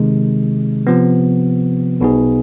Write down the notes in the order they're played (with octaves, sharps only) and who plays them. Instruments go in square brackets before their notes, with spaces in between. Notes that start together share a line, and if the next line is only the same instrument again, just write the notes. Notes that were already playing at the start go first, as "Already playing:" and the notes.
Already playing: [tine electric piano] C3 D#3 G#3
C3 F3 B3
B1 B2 B3 D#4 G#4